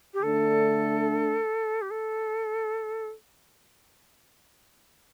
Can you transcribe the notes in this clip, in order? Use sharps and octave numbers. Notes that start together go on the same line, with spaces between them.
G4
D3 A3 D4 A4
G4
A4